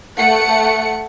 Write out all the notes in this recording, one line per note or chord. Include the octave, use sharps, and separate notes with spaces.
A3 F#5 C#7